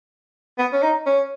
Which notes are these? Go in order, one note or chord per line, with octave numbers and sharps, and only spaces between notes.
B3
C#4
D#4
C#4